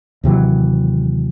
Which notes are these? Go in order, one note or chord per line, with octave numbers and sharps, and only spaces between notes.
D#2 C3 E3 F#3